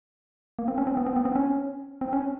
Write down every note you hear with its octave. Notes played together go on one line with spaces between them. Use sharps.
A#3
C4
C#4
C4
B3
C4
B3
C4
C#4
C4
C#4